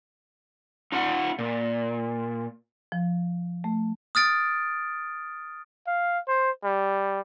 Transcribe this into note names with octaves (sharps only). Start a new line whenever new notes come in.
D#4 F4 F#5
A#2
F3
A3
D#6 F6 A6 D7
F5
C5
G3